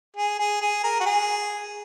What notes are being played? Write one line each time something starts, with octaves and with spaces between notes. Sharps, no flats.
G#4
G#4
G#4
A#4
F#4
G#4